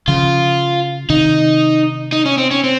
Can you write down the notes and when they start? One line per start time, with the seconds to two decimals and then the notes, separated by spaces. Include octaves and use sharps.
0.08 C#3 F3 F4
1.10 C3 D#3 D#4
2.12 D#4
2.26 C#4
2.38 C4
2.51 C#4
2.64 C4